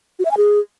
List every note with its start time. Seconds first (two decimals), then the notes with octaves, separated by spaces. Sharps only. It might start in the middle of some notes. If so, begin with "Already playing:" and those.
0.19 F#4
0.25 E5
0.31 G#5
0.37 G#4